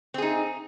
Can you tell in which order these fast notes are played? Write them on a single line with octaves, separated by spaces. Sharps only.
C4 G#4 D#4